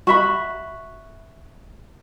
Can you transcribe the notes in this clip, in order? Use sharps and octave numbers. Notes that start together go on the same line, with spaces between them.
F#4 E5 B5